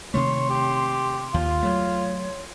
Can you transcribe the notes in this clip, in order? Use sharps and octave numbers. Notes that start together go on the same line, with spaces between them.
C3 D#3 A3 C#5 C6
G4
D#2 F4
F#3 A3 C#5